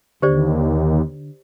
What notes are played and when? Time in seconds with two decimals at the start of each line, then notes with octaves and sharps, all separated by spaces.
0.22 D#2 D3 G4 C5 D5